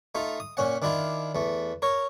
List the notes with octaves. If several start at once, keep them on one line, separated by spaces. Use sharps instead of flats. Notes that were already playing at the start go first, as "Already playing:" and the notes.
A3 D#4 F4
D#6
A#2 C#4 F#5
D#3 D4 E4 F4
E2 A3
A#4 C#5